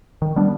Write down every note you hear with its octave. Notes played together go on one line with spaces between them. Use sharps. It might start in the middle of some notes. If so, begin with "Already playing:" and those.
D#3
G3 B3 D4